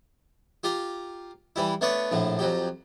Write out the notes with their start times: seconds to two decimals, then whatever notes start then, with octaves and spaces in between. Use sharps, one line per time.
0.64 F4 G4 A#5
1.56 E3 G3 E4
1.81 A3 B3 D4 B4 C#5
2.12 A#1 A2 D3
2.39 F2 F#3 G4